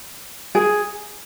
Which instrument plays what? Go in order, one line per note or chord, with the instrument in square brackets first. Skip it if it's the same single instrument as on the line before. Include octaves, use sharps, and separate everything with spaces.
[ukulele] G#4